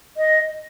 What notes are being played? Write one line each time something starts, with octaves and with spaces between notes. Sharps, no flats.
D#5